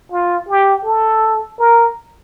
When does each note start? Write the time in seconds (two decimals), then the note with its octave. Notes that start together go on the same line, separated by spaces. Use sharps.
0.12 F4
0.49 G4
0.85 A4
1.59 A#4